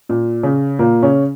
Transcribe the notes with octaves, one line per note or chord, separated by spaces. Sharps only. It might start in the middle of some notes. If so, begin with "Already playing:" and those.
A#2
C#3
A#2 A#3
C#3 C#4